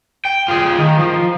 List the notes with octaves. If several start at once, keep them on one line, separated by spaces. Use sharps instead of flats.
G5
F4 G#4
D#3
F3